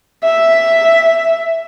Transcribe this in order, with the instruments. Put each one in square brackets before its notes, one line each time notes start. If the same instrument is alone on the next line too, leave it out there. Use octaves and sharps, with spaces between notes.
[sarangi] E5